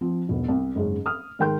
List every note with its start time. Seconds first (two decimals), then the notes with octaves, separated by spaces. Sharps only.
0.01 F3 C4
0.29 E1 B1 B2
0.48 C2
0.75 F#1 G#2 C#4
1.06 D#6 F6
1.39 G#2 D#3 A#4 G5 C6 G6